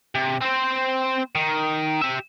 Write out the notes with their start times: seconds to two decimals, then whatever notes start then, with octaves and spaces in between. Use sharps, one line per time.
0.15 C3
0.41 C4 C5
1.35 D#3
2.01 G4 E5